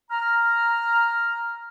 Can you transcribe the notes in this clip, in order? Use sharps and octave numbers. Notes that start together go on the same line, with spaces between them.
A#5 F6